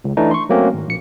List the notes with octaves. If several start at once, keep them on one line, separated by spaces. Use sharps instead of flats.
C#2
E3 A3 D4 D#4
C6 C#6
F#3 A3 A#3 C4 C#4 F#4
G#1
A#1 C#7